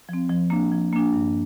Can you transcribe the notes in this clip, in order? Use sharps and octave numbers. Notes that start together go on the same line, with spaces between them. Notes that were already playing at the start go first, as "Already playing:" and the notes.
F3 C4
F3
A#3 D4
F3
A#3 D4
G2